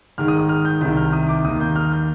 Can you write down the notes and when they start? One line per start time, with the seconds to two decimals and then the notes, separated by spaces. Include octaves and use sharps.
0.18 G#2 D#3 G#3 F6
0.28 D#6
0.39 D#6
0.49 F6
0.65 G6
0.81 C2 C3 D#3 G6
0.97 F6
1.13 D#6
1.28 D6
1.44 D#2 D#3 A#3 D#6
1.61 G6
1.76 F6
1.92 G6